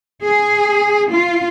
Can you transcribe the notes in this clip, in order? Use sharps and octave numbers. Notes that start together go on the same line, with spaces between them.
G#4
F4